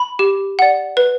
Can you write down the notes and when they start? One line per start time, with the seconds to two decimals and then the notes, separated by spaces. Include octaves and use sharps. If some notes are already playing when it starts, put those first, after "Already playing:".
Already playing: B5
0.19 G4
0.59 D5 F#5
0.97 B4